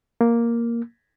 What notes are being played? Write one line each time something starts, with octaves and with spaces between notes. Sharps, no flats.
A#3